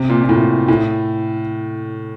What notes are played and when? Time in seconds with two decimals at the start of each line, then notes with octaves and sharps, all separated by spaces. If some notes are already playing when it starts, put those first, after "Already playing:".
Already playing: C3
0.09 A#2
0.23 A#2
0.29 A2
0.68 A2